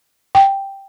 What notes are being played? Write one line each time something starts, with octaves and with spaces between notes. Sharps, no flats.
G5